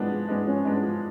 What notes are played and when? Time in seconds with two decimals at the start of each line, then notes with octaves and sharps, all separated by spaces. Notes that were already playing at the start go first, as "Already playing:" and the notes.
Already playing: F3 G#3 B3 D4
0.11 F3
0.28 G#3 B3 D4
0.47 F3 C#4
0.65 G#3 B3 D4
0.83 F3